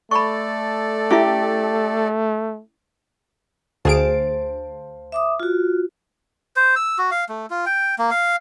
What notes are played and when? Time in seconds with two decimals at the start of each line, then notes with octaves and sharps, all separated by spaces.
0.11 A3 A4 D5 B5 C#6
1.11 C#4 E4 G4 E5
3.85 D2 G#4 C5 F5 A5 D7
5.12 E5 D6 D#6
5.40 F4 F#4
6.56 C5
6.76 E6
6.98 F#4
7.11 F5
7.29 A3
7.50 F4
7.66 G5
7.99 A#3
8.11 F5